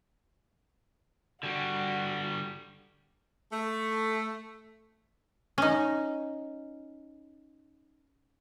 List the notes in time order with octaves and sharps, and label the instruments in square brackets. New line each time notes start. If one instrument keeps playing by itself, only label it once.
[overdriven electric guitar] D3 G3 [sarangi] F#4
[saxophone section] A3
[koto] C#4 D#4